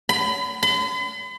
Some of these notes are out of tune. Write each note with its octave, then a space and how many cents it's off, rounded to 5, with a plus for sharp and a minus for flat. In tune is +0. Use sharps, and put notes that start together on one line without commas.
B5 +30
B5 +45